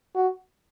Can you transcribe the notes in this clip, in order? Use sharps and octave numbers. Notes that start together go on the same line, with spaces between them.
F#4